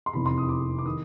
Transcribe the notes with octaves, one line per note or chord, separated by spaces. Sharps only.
C6
F1 E2 C3 B5
C6
D#6
D6
D6
D#3 D#6